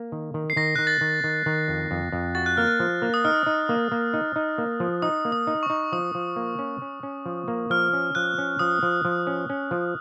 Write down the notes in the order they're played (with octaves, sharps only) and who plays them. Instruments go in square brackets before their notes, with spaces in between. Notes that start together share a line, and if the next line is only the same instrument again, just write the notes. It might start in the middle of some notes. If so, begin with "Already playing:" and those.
Already playing: [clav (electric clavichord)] A#3
D#3
D#3
[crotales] C7
[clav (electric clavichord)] D#3 [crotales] A#6
[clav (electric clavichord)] D#3 [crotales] F#6
[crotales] A6
[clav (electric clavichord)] D#3
D#3
D#3
F2
F2
F2
[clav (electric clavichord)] F#4 [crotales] A6
[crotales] F#6
[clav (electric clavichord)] A#3 [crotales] F6
[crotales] F#6
[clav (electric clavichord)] F3
A#3
[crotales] D#6
[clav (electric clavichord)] D#4 [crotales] F6
[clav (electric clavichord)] D#4
A#3
A#3
D#4
D#4
A#3
F3
[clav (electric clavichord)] D#4 [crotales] D#6
[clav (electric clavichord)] A#3
[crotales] D#6
[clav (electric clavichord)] D#4
[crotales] C#6
[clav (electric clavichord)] D#4
[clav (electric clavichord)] F3 [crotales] D#6
[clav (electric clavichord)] F3
A#3
C#4
C#4
C#4
F3
A#3
[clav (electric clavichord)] F3 [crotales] F6
[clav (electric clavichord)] C#4
[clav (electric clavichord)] F3 [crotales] F#6
[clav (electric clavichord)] C#4
[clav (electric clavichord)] F3 [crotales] D#6
[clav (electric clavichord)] F3
F3
C#4
C#4
F3